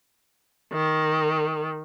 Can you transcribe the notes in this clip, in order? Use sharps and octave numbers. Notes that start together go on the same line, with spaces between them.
D#3